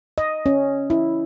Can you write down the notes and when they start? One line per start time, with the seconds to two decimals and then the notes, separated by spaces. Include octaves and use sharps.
0.18 D#5
0.46 C#4
0.90 E4